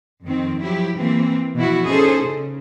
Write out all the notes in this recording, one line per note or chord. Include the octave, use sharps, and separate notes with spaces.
F2 D#3 C4
F3 F#3 E4 G4
E3 A#3 C4
B2 E3 F3 E4 F#4
C#4 D#4 G#4 A4 C5
C#3